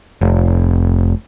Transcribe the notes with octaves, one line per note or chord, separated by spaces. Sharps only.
F1